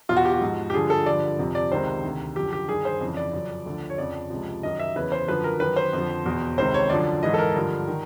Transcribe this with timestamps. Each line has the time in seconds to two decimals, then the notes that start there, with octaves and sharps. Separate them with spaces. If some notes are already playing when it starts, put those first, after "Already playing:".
0.09 E2 B2 F4
0.17 F#4
0.25 G4
0.33 F#4
0.41 G#2 F3
0.70 G4
0.74 G2 D3 F3 G#4
0.90 A4
1.06 G2 D3 F3 D5
1.38 F2 C3 F3
1.55 D5
1.71 C#2 C3 D#3 C5
2.03 D2 C3 D#3
2.36 F#2 D3 F3 G4
2.53 G4
2.68 G2 D#3 G#4
2.85 C5
3.01 F2 C#3 E3
3.17 D5
3.33 F#2 C#3 F3
3.66 D2 D3 F3
3.90 C#5
3.98 F2 C#3 F3 D5
4.30 C#2 C3 F3
4.63 F#2 D#3 D#5
4.79 E5
4.96 E2 C#3 E3 B4
5.12 C5
5.28 F#2 D3 F3 B4
5.44 A#4
5.60 F#2 D#3 B4
5.76 C5
5.93 F2 D3 F3
6.25 E2 B2
6.58 C#2 C3 D#3 C5
6.74 C#5
6.90 F#2 D3 F3 D5
7.23 G#2 E3 D#5
7.34 A4
7.39 A#4
7.54 G2 D3 F3
7.87 D#3